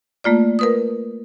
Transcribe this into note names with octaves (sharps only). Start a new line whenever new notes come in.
A3 A#3 F4 D5
A#4 B4 D#6